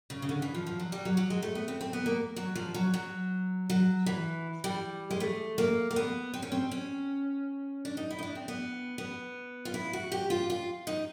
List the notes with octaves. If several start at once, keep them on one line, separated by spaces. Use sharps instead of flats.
C#3
C#3
D3
E3
F3
F3
F#3
G3
F#3
F#3
G#3
A3
B3
C4
C4
B3
A#3
F#3
F3
F#3
F#3
F#3
E3
G3
G#3
A3
A#3
A#3
B3
C4
C#4
C4
C#4
D4
D#4
E4
D#4
D4
C4
B3
B3
F4
E4
F#4
G4
F4
F4
D#4